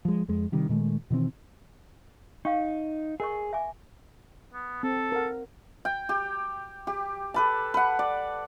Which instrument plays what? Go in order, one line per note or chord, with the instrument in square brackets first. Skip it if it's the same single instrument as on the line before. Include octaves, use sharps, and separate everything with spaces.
[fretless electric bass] F3 G#3
F2 G#3
C3 D#3 G3
A#2 D#3 G#3 A3
B2 D#3 E3 C4
[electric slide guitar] D#4 [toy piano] F5 G5 C#6
[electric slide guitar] G#4 [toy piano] A#4 D#5 C#6
[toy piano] E5 G#5 D6
[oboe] B3
[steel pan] C4 [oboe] A4
[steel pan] A#4 F#5
[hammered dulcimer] G5
G4
G4
A4 B4 A5
B4 F#5
D5